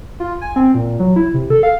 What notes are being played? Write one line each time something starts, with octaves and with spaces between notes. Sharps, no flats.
F4
G#5
C4
A#2
F#3
E4
C3
A4
F5